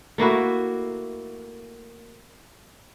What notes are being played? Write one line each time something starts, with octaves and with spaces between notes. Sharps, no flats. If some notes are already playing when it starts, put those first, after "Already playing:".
A3 A#3 E4 F#4